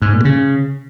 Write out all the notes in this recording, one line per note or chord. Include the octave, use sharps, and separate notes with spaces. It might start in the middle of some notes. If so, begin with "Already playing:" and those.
G#2
A#2
C#3